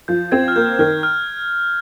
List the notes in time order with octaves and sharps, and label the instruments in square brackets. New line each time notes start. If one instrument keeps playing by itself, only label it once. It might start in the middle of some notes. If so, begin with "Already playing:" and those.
[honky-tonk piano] F3 [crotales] G6
[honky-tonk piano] C4 [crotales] G#6
[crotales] F6
[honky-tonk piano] A#3 [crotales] G6
[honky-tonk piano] D#3 [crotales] F6
[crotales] F6